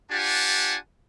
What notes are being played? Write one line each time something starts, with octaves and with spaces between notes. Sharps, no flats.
D4 F4 G4 F#5 G#5 A5